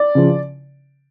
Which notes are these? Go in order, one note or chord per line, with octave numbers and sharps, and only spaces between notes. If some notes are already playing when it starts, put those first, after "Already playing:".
Already playing: D5
C#3 F3